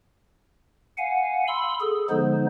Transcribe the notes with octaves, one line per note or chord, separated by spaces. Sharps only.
F5 F#5 G#5
B5 C6 E6
G#4 A4
D3 F3 G#3 B3 D#4 C5